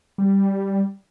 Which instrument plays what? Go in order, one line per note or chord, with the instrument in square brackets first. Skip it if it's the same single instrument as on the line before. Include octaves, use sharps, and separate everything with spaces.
[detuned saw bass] G3